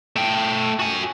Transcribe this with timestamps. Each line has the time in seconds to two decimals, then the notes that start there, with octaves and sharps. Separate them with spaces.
0.16 A3 G5
0.80 F#4 G#5